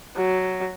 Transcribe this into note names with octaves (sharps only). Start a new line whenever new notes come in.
F#3